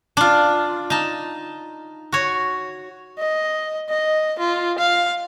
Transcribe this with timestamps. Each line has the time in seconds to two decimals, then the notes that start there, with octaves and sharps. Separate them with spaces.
0.17 D4 F4
0.90 D#4 A5
2.12 F#4 C#5
3.19 D#5
3.89 D#5
4.39 F4
4.79 F5